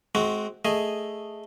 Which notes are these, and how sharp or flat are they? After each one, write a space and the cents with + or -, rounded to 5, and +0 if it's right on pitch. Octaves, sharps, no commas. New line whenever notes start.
G#3 +35 C4 +0 F#4 +0
A3 +0 G#4 +0 D#5 +0